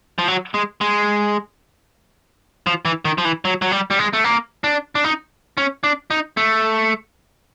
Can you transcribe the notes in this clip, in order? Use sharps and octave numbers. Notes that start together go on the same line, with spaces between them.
F3
F#3
G#3
G#3
F3
E3
D#3
F3
E3
F#3
F#3
G3
G3
G#3
A3
A#3
D4
D4
D#4
C#4
D4
D#4
A3